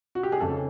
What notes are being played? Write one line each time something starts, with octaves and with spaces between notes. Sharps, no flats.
F#4
G4
G#4
F1 F2 C#3 A4